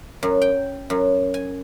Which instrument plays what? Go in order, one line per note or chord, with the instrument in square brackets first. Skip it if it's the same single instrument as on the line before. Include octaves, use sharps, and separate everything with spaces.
[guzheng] F#2
G5
F#2
G#5